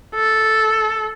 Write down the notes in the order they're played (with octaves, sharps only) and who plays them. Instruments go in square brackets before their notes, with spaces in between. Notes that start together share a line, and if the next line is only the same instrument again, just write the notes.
[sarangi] A4